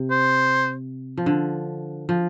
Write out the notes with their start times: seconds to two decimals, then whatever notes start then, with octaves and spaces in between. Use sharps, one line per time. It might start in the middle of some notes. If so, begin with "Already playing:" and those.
Already playing: C3
0.11 C5
1.17 F3
1.26 D3
2.09 F3